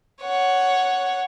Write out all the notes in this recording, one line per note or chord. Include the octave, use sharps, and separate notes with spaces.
C#5 F#5